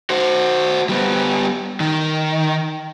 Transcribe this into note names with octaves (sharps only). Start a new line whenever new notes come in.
F#4 C5
G3 B3
D#3